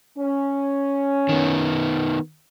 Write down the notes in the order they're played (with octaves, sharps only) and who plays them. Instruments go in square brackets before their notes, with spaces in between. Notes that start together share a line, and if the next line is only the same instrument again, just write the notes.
[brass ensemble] C#4
[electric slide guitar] D#3 B3